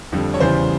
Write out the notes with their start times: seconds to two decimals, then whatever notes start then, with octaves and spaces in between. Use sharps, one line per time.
0.12 F2 D3 G3
0.34 C#5
0.40 E2 C#3 E3 G3 C5